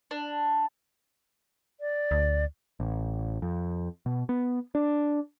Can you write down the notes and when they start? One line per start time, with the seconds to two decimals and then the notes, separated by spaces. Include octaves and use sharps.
0.11 D4
1.81 D5
2.11 D2
2.80 A1
3.42 F2
4.06 B2
4.29 B3
4.75 D4